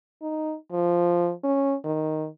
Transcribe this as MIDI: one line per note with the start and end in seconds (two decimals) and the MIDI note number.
0.22 0.55 63
0.72 1.32 53
1.44 1.75 61
1.85 2.27 51